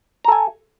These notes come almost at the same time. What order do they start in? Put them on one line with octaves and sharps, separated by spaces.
A#5 A4 G#5